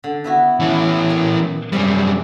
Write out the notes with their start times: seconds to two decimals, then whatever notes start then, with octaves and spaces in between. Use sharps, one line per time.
0.04 D3
0.24 B3 E4 F#4
0.60 E3 C#4
1.10 A#2
1.73 F#2 C3 G3 C#4 G#4